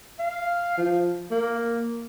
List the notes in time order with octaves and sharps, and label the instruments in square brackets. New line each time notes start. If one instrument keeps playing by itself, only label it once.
[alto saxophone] F5
F3
A#3